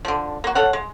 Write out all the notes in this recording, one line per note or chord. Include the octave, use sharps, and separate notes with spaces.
D3 F3
A#3 F#4
A4 C#5 F5 F#5
G#3